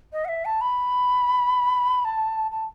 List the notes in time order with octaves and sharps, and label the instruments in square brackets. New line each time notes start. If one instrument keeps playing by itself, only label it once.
[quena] D#5
F#5
E5
A5
B5
A5
A5